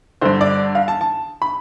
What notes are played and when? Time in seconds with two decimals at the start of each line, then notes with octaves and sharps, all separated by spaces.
0.21 G2 D3 C5
0.41 D5
0.75 F5
0.88 A5
1.01 A5
1.42 B5